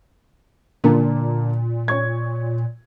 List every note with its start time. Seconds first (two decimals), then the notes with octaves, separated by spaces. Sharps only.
0.84 A#2 D3 A#3 D4
1.88 C#5 C#6 G#6